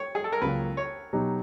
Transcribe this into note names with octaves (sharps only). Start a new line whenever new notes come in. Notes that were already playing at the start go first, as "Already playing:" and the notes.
Already playing: C#5
G#4
A4
A#4
C#2 C#3 F#3 A#3 B4
C#5
B2 F#3 B3 D#4 G4